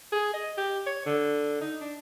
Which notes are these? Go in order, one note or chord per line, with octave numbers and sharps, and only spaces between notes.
G#4
D#5
G4
C#5
D3
D#4
D4